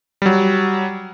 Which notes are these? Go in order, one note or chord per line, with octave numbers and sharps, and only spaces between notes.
F#3 G3